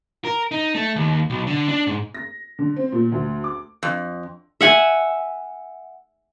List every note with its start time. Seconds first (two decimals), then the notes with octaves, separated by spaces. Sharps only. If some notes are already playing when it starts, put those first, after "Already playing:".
0.25 A#4
0.51 D#4
0.75 A3
0.96 D#2
1.30 B1
1.47 D3
1.68 D4
1.87 G#2
2.14 A#6
2.59 D3
2.76 C4
2.92 A#2
3.12 D2
3.44 D6
3.83 F2
4.61 E5 F#5 G#5